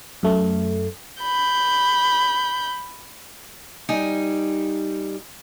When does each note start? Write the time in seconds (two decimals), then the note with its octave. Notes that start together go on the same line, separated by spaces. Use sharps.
0.23 F#2 A3
1.23 B5 G6
3.89 G3 D#4 G#5